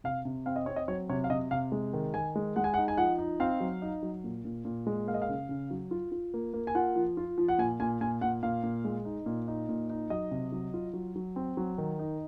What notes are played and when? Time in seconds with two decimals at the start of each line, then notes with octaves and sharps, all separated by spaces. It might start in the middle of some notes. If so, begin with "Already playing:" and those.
0.04 C3 F5
0.25 C3
0.46 C4 F5
0.56 D#5
0.66 C4 C#5
0.76 D#5
0.88 F#3 C#5
1.09 C3 C#5
1.24 F5
1.30 C3 D#5
1.51 C3 F5
1.72 G#3
1.93 D#3
2.14 D#3 G#5
2.36 G#3
2.56 G#3 F#5
2.64 G#5
2.74 F#5
2.77 D#4
2.88 G#5
2.97 F3 F#5
3.18 D#4
3.40 C4 F5
3.60 F#3
3.82 D#4
4.03 F#3
4.24 A#2
4.45 A#2
4.65 A#2
4.87 G#3
5.07 A#3 F5
5.14 D#5
5.22 F5
5.29 C#3
5.49 C#3
5.71 F#3
5.91 F4
6.12 F4
6.34 A#3
6.54 A#3
6.67 G#5
6.75 F4 F#5
6.96 F3
7.17 F4
7.38 F3
7.48 F#5
7.58 A#2 G#5
7.80 A#2 G#5
8.01 A#2 G#5
8.21 A#2 F#5
8.43 A#2 F5
8.63 A#2
8.85 G#3
9.05 D#4
9.26 A#2
9.48 D#4
9.69 A#2
9.90 D#4
10.10 F#3 D#5
10.31 C3
10.52 F#3
10.74 F4
10.93 F#3
11.16 F#3
11.36 C4
11.57 F#3
11.78 D#3
11.99 D#4